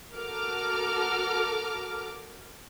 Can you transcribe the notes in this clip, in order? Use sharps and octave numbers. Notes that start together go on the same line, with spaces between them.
F#4 A4 A#4 D6 F6